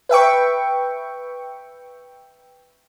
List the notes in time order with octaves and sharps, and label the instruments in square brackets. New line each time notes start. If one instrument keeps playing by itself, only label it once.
[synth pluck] B4 E5 G5 C#6